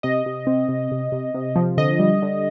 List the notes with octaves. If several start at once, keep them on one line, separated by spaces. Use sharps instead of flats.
C3 D#5
C3
C4
C3
C3
C3
C3
F3
D3 D#5
G3
D3